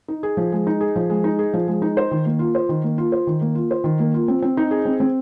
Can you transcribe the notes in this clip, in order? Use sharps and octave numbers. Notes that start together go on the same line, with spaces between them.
D#4
G#4
F3
G#3
D#4
G#4
F3
G#3
D#4
G#4
F3
G#3
D#4
C5
D#3
A#3
F4
C5
D#3
A#3
F4
C5
D#3
A#3
F4
C5
D#3
A#3
F4
C4
C4
D#4
G#4
C4
C4